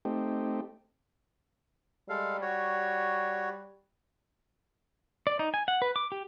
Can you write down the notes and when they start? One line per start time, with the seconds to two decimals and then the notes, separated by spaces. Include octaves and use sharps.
0.05 A3 C4 D#4 G4
2.09 G3 G#3 A4 F5
2.42 F#4 C#5
5.27 D5
5.39 D#4
5.54 G#5
5.68 F#5
5.82 B4
5.96 D6
6.12 G4